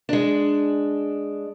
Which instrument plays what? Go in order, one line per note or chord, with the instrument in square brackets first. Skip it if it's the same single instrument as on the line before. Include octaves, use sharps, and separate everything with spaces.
[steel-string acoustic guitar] G#3 D4